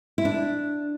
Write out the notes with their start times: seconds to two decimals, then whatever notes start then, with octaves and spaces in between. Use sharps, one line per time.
0.18 E4
0.25 D4